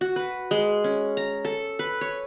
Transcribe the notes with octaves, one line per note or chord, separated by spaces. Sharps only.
F#4
B4
G#3
C#4
A#5
A4
B4
C#5